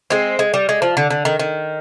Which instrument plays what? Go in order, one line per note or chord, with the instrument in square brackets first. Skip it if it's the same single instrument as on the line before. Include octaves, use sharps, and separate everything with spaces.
[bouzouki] G#3 C4
G#3
G3
G#3
F3
D3
D3
D#3
D#3